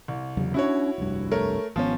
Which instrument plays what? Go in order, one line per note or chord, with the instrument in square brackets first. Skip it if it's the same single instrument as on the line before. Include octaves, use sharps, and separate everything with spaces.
[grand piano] C2
[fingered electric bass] E2 C#3 F#3
[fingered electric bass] C#4 D4 [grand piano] E4 F#4 C#5
[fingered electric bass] F1 C2 G2
[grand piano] A3 A#4 C#5
[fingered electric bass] G#1 B3 [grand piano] F3 C#4